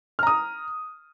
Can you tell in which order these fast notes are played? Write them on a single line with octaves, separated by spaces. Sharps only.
F6 A#5 D#6